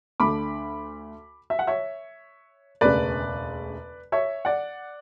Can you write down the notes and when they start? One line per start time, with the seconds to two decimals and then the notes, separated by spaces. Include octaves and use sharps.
0.20 D2 D3 A3 B5 D6
1.50 E5
1.59 F#5
1.67 C#5 E5
2.81 E1 D2 C#3 B4 D5
4.12 C#5 E5
4.45 D5 F#5